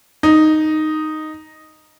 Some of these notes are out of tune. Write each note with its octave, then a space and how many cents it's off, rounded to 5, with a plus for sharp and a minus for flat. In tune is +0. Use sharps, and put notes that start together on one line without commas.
D#4 -5